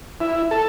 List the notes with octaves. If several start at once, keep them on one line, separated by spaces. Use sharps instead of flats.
E4
A4